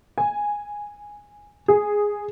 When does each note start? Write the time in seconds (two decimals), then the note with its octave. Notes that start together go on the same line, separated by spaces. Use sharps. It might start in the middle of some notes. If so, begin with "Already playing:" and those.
0.18 G#5
1.68 G#4